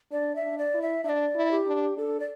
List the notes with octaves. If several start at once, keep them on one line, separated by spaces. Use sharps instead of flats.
D4 D5
E5
D4
D5
E4
E5
D4 D5 E5
E4
G4
D4
D4 A4
D5